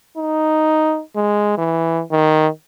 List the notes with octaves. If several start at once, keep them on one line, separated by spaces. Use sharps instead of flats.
D#4
G#3
E3
D#3